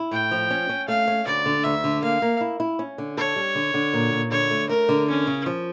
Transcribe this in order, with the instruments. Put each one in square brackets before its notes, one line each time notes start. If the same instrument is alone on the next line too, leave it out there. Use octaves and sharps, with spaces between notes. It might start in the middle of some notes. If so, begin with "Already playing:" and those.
Already playing: [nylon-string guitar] E4
[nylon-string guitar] A2 [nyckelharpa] G5
[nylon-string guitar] F3
C#4
C#4
[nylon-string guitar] A3 [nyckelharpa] F5
[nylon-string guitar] C#4
[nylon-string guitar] D2 [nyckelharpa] D5
[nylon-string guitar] D3
[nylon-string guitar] D2 [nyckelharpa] E5
[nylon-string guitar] D3
[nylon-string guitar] A#3 [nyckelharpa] F5
[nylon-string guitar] A#3
E4
E4
C#4
D3
[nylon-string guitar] A4 [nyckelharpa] C#5
[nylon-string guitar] G3
D3
D3
A#2
A#2
[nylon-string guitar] D3 [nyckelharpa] C#5
[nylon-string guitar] A3
[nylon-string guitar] A3 [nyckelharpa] A#4
[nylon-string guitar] D3
[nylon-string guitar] E2 [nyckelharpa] C#4
[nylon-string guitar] C#3
F3